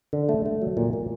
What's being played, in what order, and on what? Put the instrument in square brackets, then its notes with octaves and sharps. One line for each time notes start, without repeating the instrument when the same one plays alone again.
[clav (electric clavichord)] D3
A3
A3
F#3
A#2
A#2